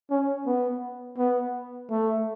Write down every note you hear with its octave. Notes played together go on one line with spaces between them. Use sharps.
C#4
B3
B3
A3